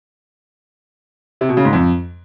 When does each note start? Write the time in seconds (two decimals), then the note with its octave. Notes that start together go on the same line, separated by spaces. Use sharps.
1.41 C3
1.49 B2
1.57 C#3
1.65 G#2
1.73 F2